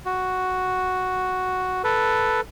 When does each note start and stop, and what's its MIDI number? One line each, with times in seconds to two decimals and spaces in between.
0.06 1.82 66
1.84 2.41 69
1.84 2.41 71